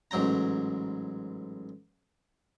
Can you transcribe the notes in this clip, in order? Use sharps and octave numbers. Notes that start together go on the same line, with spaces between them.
A1 G#2 F#3 G5 A#5